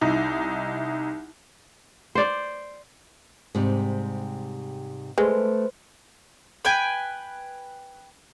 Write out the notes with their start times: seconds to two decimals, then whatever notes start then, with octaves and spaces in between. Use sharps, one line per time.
0.01 C2 D#4 E4
2.15 C5 D5
3.55 G#2 C3 G3
5.18 G#3 A3 B4 C5
6.65 B4 G5 G#5